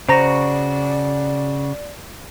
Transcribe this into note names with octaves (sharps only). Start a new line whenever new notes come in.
C#3 F#4 C5 D5 A#5 A#6